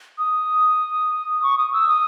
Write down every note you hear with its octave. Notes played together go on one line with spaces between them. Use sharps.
D#6
C#6
D#6
E6
D#6